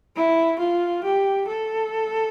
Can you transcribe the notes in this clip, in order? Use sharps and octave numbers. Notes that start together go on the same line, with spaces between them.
E4
F4
G4
A4